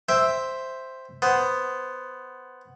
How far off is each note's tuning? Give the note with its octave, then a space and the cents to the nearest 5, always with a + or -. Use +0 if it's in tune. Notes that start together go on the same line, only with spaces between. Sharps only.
C5 +0 E5 +0 G5 +5
B3 +10 C5 +0